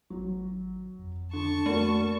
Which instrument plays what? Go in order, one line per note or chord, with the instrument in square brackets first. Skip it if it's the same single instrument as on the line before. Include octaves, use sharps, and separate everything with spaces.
[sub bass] G#1 [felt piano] F#3
[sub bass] F2
[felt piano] D3 [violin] A5 C#6
[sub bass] F2 [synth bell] A3 [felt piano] A#3 F#4